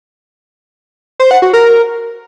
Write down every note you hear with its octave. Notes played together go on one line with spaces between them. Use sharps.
C5
F#5
F#4
A#4